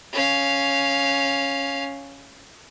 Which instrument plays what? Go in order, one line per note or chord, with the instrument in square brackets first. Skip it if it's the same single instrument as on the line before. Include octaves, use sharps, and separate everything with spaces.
[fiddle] C#4 F5